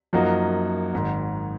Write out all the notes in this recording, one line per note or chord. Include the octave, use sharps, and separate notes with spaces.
F#2 F3 A#3 D#4 F#4
G#1 G#2 D#3